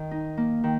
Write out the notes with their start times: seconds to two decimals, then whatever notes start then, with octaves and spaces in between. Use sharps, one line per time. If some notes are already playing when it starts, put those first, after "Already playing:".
Already playing: D#3
0.11 D#4
0.37 A#3
0.64 D#3